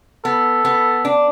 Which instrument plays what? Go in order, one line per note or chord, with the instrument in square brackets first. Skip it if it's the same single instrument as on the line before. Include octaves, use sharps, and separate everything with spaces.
[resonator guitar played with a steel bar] B3 [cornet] A4
[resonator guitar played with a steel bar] B3
D4